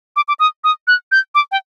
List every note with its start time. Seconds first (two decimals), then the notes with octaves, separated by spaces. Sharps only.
0.16 D6
0.28 D6
0.40 D#6
0.64 D#6
0.87 F#6
1.12 G6
1.35 D6
1.52 G5